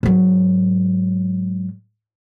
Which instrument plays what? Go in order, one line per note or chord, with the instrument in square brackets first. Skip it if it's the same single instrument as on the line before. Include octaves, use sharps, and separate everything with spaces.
[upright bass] G#2 F#3